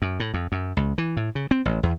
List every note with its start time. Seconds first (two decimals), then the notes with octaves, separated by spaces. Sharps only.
0.02 F#2
0.20 A2
0.34 F2
0.52 F#2
0.77 C#2
0.98 E3
1.17 A2
1.35 C#3
1.51 C4
1.65 A1
1.83 E2